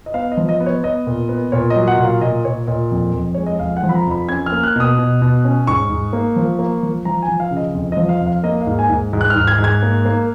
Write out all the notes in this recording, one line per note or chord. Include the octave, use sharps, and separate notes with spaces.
D#5
B3 F5
D#5
F3
D#5
B3
C#5
B3 D#5
A#2
B3
A#2 C#5
D#5
F#3
F#5
A#2
F5
A#2 D#5
A#2 C#5
A#2 D#5
F2
F2
G#3 C#5
D#5
F2 F5
F#5
F3
B5
A#5
F2 B5
C#4 G#6
F6
A#3
F#6
B2 D#6
B2
B2
C#4
G#2 C#6
G#2
A#3
F3
A#3
F3
F3 A#5
G#5
F3
F5
C#3
D#5
F2
F3 D#5
F5
F2
F5
A#3 D#5
F5
G#2
G#5
G#2
G#2
F#6
F6
G#2
G#6
G#2
G#6
A#3
A#3